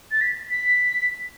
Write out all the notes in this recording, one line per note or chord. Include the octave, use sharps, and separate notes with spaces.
A6
B6
B6